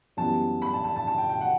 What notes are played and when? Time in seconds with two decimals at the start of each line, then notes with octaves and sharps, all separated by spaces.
0.17 F#2 E3 G3 B3 A5
0.62 B5
0.73 A5
0.84 A5
0.96 A5
1.07 A5
1.18 G5
1.29 G5
1.41 F#5